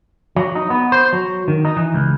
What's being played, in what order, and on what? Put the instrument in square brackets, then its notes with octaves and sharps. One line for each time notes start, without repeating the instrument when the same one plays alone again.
[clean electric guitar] F#3
D#4
B3
C5
F#3
D#3
D#4
E3
C#2